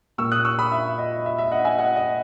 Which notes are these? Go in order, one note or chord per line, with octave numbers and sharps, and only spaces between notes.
A#2 A#3 C#6 E6
D#6 F#6
C#6 E6
B5 D#6
E5
D#5
E5
E5
D#5 F#5
E5 G#5
D#5 F#5
D#5